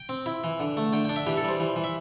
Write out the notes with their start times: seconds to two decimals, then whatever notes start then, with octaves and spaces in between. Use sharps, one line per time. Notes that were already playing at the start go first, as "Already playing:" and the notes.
Already playing: G5
0.09 C4
0.26 E4
0.44 E3
0.60 D3
0.77 A3
0.93 D3 G5
1.05 D4 G5
1.16 E5
1.26 E3 G4
1.37 A4
1.44 G3 C5
1.60 E3
1.76 E3
1.84 E5